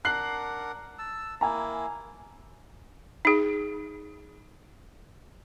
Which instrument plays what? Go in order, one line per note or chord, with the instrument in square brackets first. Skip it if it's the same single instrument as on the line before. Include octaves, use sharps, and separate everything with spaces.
[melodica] D4 A#4 F#5 [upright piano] F#6 C7 F#7
[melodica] A5 E6
[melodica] A#3 E4 [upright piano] G#5 A#5
[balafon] D#4 G#4